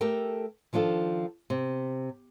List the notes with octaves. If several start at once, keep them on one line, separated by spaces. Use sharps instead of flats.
A3 G4 A4 A#4 G5
D#3 F3 D4 F4 A4
C3